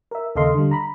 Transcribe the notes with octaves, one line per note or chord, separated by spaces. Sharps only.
A#4 E5
D#2 C#3 A4 D#5 F5 C6
D3 G3
A#5 B5